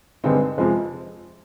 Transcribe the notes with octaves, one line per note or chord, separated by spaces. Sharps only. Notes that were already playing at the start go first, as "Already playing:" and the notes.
G2 D3 G#3 C4 D#4
F2 C3 F3 G#3